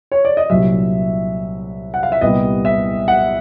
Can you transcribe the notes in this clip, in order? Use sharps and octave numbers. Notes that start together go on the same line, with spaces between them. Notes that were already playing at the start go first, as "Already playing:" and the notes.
C#5
D5
D#5
C2 A#2 F#3 E5
F#5
F5
E5
C2 A#2 G3 B3 D#5
E5
F#5